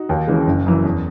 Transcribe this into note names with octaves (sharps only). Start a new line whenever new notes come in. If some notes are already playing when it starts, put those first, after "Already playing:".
Already playing: D#4 F#4
D#2
C#3 E3 G#3
F#1
F#2 E3
E2